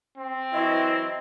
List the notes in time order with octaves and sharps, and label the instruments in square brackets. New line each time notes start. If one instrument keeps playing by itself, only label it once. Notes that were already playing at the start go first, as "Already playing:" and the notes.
[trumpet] C4
[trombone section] E3 F#3 E4 [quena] D#5